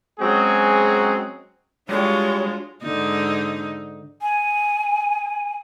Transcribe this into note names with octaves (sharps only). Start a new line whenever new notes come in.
F#3 G#3 C4 C#4 F#4 G#4
G3 G#3 D4 F4 F#4 C#5
G#2 D3 D#4
G#5